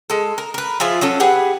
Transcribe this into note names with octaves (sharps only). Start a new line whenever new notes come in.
G#3 A4
A#4
A#4 B4
F3 F4 G#4 E5
F#3 C#4 A4
G4 G#4 B4 F#5